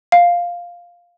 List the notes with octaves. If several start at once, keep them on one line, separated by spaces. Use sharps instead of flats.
F5